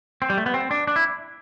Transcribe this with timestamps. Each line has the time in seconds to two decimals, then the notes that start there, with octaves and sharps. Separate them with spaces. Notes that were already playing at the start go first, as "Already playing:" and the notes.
0.22 C4
0.30 G3
0.38 A3
0.46 B3
0.54 C4
0.71 D4
0.87 D4
0.96 E4